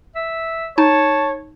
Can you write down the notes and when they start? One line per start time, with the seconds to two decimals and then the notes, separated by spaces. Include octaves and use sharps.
0.15 E5
0.78 D#4 C#5 A5